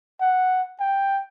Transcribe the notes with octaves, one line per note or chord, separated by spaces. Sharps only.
F#5
G5